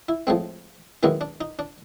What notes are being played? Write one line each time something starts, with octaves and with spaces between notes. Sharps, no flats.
E4
A2 F3 G#3 C4
F#2 D#3 G#3 B3 E4
D4
D#4
D4